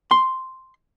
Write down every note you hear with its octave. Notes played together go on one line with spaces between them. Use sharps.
C6